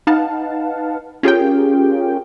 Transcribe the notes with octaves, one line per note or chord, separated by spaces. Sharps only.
D#4 B4 F5 F#5 A5
C#4 F4 G4 G#4 A#4 G5